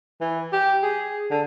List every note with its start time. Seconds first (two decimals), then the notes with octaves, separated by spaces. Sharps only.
0.21 E3
0.52 G4
0.83 G#4
1.31 D3